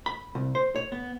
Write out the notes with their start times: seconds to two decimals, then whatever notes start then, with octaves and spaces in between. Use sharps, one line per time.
0.06 B5
0.35 C2
0.55 C5
0.76 C#5
0.92 B3